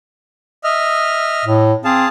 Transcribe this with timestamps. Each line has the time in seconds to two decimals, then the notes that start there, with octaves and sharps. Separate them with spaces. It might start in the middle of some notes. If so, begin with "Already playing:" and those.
0.64 D#5 E5 F6
1.45 A2
1.85 C4 G#4 F5 A5